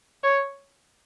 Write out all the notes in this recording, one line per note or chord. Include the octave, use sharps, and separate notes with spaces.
C#5